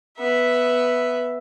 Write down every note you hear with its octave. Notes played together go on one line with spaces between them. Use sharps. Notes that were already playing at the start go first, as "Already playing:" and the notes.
B3 E5